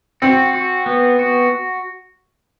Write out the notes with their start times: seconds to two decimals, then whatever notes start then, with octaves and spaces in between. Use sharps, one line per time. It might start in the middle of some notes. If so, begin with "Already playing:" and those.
0.22 C4 F#4
0.54 F#4
0.86 B3
1.19 F#4